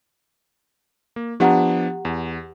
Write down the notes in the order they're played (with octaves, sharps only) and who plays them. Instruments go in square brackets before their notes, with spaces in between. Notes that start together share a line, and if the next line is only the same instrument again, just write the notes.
[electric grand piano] A#3
[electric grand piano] F3 B3 D4 [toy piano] G4 F#5 A#5
[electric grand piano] E2